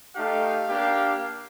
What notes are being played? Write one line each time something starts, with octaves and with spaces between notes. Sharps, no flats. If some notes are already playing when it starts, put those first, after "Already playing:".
A3 D#4 G4 F5
A#3 D4 G4